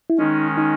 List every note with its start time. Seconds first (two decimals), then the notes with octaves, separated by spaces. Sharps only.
0.10 E4
0.18 D#3 G#3 C#4 D#4
0.58 D#4